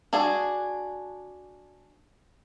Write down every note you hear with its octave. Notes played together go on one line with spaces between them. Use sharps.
D4 F#4 G#4